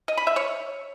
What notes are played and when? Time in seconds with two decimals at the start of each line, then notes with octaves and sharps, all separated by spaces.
0.08 D#5
0.17 B5
0.27 E5
0.36 C#5